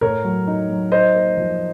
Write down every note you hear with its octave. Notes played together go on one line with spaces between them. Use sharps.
A2 A#4 C#5
F#3
D#4
F#3
D#4 C5 D#5
A#3
F3